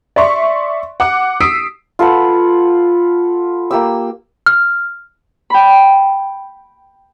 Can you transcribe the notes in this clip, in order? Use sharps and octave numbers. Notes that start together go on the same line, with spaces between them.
D5 E5 C6 C#6
F#5 D6
D#6 E6 B6 C7 D7
F4 A4 B4 F#5
A#3 G4 E6
F6
G5 B5